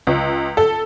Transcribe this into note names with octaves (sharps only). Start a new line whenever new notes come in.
C#2
A4